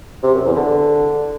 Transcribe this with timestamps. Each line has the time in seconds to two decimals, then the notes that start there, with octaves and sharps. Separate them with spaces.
0.23 C3
0.34 F#2
0.45 E2
0.56 D3